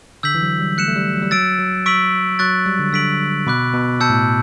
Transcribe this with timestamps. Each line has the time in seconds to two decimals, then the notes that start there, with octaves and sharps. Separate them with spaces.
0.23 D3 E6 G6 B6 F#7
0.35 E3
0.42 F#3
0.59 G3
0.77 A3 F#6 C#7 E7
0.88 A3
0.96 G3
1.13 F#3
1.23 G3
1.31 F#3 E6 A6 D7
1.59 F#3
1.86 C#6 E6 B6 D7 F#7
2.39 F#3 C#6 F#6 A6
2.66 G3
2.79 D3
2.93 D3 E6 B6 D7 F#7
3.47 B2 B5 D6 F#6
3.74 B2
4.00 B2 A5 E6 G6 C#7
4.10 A2